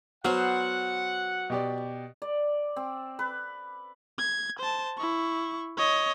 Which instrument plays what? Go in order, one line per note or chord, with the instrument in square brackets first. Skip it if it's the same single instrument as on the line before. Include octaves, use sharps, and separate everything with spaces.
[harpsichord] F#3 [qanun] B3 C5 [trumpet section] F#5 [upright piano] F6
[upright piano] B2 G4 D5
[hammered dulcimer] D5
C4
B4
[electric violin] G#6
C5 A5
E4 C#6
C#5 D#5